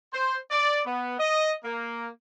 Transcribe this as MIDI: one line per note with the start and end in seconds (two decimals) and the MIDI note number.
0.13 0.37 72
0.51 0.81 74
0.85 1.16 59
1.19 1.53 75
1.64 2.08 58